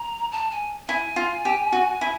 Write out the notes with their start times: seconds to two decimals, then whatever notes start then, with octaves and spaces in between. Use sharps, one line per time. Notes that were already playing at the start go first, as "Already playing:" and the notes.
Already playing: A#5
0.32 A5
0.51 G#5
0.88 E4 G#5
1.16 F4
1.45 G4
1.72 F#4
2.01 E4